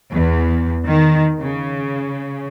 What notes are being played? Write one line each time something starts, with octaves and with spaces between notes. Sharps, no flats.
E2
D#3
C#3